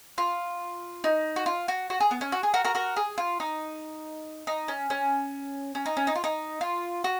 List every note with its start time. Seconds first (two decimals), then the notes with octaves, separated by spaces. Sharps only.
0.18 F4
1.04 D#4
1.36 F#4
1.46 F4
1.68 F#4
1.90 F#4
2.00 G#4
2.11 B3
2.21 C#4
2.32 F#4
2.43 G#4
2.54 F#4 A#4
2.65 F#4 A#4
2.75 F#4 A#4
2.96 G#4
3.18 F4
3.40 D#4
4.47 D#4
4.68 C#4
4.90 C#4
5.75 C#4
5.86 D#4
5.97 C#4
6.07 D#4
6.15 F4
6.24 D#4
6.61 F4
7.04 F#4